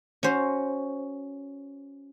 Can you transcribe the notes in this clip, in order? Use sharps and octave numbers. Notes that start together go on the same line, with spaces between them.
C#4 F#4 C5